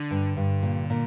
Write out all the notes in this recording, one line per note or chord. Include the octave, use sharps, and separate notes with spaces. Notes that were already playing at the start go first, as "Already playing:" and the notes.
Already playing: D3 D4
G2
G2
A#2
A#2